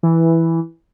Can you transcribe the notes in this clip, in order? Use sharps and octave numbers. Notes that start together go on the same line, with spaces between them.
E3